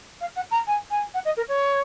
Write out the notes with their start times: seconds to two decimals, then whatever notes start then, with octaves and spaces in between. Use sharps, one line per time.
0.21 F5
0.36 F#5
0.51 A#5
0.67 G#5
0.90 G#5
1.14 F#5
1.25 D#5
1.37 A#4
1.48 C#5